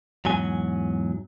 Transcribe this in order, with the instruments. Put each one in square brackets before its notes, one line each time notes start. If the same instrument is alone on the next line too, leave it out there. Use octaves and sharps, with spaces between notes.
[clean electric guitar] E2 G#2 F#3 G#5